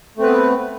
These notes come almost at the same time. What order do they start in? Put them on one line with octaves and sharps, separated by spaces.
A3 C4 B4 B3